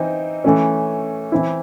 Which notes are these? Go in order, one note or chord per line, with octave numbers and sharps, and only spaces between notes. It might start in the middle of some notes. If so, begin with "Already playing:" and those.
Already playing: E3 C4 D#4
E3 A3 C#4
E3 C4 E4